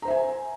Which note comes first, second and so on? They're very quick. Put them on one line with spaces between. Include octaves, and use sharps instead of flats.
A#5 C5 E5 G#5